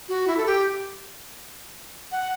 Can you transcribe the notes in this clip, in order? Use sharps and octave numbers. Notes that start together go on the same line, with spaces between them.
F#4
E4
A4
G4
F#5